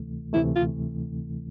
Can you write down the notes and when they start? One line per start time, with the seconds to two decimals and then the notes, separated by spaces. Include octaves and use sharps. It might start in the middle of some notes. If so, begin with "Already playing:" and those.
Already playing: D2 C3 E3 A3
0.33 D2 C3 E3 A3 E4
0.56 F4